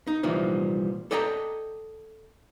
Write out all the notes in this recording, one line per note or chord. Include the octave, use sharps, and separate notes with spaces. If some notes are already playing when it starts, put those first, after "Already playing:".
D#4
C2 A#2 E3 F3 G3 D#4
A4 D5 D#5 G5 G#5 A#5